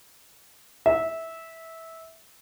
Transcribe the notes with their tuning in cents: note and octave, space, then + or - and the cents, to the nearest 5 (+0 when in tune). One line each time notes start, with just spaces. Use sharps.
E5 -15